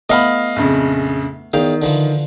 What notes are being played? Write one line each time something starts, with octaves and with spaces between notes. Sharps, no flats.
A3 B3 E4 D#5 F5 B5
A#1 F2 C#3
E2 D#3 F5 G5
D3 E3 F3